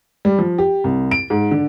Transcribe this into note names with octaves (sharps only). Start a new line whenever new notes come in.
G3
F3
G4
C2
D7
G#2
D3